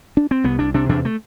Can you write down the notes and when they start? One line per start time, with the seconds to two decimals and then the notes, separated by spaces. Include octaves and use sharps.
0.17 D4
0.31 C4
0.44 C2 B3
0.59 C2 D4
0.74 C3 D4
0.89 E2 D4
1.05 A3